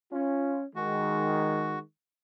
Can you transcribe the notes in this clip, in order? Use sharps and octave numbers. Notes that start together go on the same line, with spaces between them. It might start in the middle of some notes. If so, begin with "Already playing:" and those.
C#4 F4
D#3 G#3 F#4